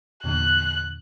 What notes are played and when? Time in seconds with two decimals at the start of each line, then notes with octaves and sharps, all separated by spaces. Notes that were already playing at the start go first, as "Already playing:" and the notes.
0.24 E2 A#2 D3 F#6